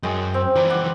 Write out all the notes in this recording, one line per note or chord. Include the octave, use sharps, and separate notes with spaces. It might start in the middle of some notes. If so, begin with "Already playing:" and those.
F#2 G#3 G5 C#6
C4
E3 F3 D5 A#5
D5 F#5